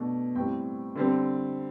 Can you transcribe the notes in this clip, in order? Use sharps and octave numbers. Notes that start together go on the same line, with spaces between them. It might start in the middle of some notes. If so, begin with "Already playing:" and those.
Already playing: B2 A3 D4
A2 G3 C4 G5
D3 G3 C4